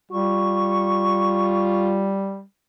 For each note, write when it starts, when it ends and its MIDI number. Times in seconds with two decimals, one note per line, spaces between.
0.11 2.42 55
0.11 2.19 65
0.11 1.88 85